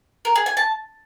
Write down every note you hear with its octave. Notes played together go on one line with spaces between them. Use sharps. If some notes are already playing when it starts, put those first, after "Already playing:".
A#4
G#4
G#5
A5